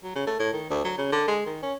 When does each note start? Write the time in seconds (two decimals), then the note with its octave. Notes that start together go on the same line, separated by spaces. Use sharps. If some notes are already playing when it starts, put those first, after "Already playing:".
0.04 F#3
0.16 C#3
0.27 A3
0.39 A2
0.53 D#3
0.70 D2
0.84 F#3
0.98 C#3
1.12 D3
1.27 G#3
1.46 D#3
1.63 C#4